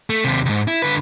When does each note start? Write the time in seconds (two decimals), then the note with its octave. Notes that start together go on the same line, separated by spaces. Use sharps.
0.10 A3
0.24 D#2 C3
0.46 C#2 G#2
0.68 E4
0.82 D3 B4